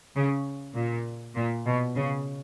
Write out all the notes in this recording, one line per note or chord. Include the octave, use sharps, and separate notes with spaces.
C#3
A#2
A#2
B2
C#3